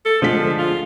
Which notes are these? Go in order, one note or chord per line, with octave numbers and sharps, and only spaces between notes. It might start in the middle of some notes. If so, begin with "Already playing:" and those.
A4
D3 F3 G#3 B6
F4